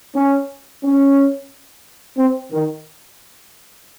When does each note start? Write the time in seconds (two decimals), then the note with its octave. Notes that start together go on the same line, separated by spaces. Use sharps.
0.15 C#4
0.84 C#4
2.17 C4
2.52 D#3